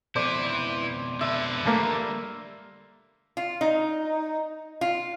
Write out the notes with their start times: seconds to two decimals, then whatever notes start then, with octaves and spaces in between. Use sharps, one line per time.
0.16 F2 B2 E4 B4 C5 D5
1.21 D3 B4 E5
1.66 G3 A3 A#3
3.37 F4
3.61 D#4
4.81 F4